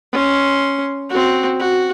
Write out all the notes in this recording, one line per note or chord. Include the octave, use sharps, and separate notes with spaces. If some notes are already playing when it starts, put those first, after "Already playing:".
C#4 C6
C4 F#4
F#4